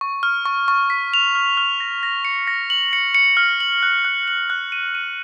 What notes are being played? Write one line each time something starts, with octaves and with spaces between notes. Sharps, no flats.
C#6
F6
C#6
C#6
B6
F7
F6
F6
A#6
A#6
C#7
A#6
F#7
C#7
C#7
F6
F#7
F#6
F#6
F#7
F#6
D#7
D#7